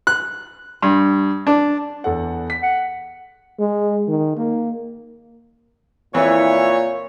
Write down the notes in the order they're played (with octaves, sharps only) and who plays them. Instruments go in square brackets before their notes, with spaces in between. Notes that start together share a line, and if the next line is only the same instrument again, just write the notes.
[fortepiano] F#6
G2
D4
[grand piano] E2 A4 F#5
B6
[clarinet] F#5
[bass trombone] G#3
D#3
A#3
[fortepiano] F2 E3 [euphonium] A#2 [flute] E4 [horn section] C#5